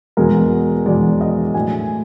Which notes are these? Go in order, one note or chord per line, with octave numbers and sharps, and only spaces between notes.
E2 B2 G#3 A#4
E2 B2 G#3 D5
D#5
A2 F#3 A3 G#5